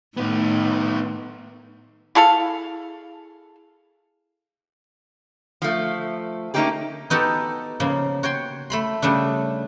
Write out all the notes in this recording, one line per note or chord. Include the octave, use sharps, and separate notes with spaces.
A2 D#3 A3 B3 D#4
E4 G#4 A4 F5
F3 A3
A3 A#3 C#4 D#4 G4 G#4
B3 D#4 F#4 G4 A4
C#3 F3 A#3
F#4 C#5 G5 C6
A3 B5 C6
C#3 G3 A3 D4